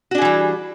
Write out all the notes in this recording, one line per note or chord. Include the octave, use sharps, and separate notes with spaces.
E3 G3 D4 F#4 G#4